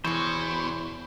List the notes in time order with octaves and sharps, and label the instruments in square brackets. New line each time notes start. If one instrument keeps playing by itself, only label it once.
[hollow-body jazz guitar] E2 E3 [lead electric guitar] B2 [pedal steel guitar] C5 C#5